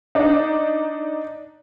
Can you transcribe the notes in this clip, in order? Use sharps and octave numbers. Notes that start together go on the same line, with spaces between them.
D4 D#4